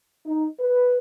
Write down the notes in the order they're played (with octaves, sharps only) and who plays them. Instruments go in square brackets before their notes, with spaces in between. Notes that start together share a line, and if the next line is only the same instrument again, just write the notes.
[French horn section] D#4
B4